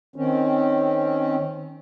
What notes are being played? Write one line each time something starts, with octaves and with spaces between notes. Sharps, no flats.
D#3 C4 C#4